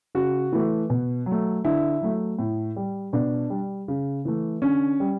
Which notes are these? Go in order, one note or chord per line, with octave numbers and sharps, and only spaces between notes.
C#3 F#4
E3 A3
B2
F#3
A3
D3 E4
F#3 A3
A2
G3
B2 D4
G3
C#3
E3 A3
D3 C#4
G3